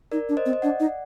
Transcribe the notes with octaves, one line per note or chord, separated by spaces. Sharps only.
D#4 A#4 D5
D4
C5 D#5
C4
D#5
D4 D5 F#5
D#4